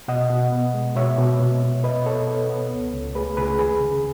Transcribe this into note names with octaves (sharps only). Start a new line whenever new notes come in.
B2 D#5 F#5
B2
B3
G#3
B2 C#5 E5
B2
B2
B2
B3 B4 D#5
B3 A4 C#5
B3
B3
C#2
C#2
A3 G#4 B4
C#2 G#4 B4
D#2 G#4 B4
C#3